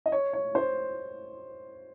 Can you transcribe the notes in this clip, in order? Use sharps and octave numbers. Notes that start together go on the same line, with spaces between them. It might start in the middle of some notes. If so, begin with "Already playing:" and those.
D#5
C#5
C#5
C5